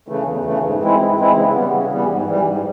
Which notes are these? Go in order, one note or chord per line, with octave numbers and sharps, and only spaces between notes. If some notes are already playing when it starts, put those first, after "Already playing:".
C#3 E3 A3
E2
C#3 E3 A3
G#2
E3 G#3 C4 E4
G#2
E3 G#3 C4 E4
C#3
E3 G3 B3
C#3
E3 G3 B3
G#2
E3 G3
G#2